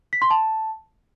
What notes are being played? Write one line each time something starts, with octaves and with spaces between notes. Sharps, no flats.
B6
C6
A5